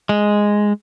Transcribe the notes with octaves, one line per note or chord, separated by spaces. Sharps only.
G#3